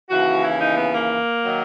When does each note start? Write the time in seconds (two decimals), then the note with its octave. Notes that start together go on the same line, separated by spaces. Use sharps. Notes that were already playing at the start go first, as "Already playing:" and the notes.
0.10 D#2 C#3 E3 F#4
0.43 E4
0.61 D#4
0.77 B3
0.94 A#3
1.44 D#3 F#3